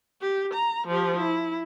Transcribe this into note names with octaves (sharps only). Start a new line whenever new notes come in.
G4
A#5
F3 G4
E4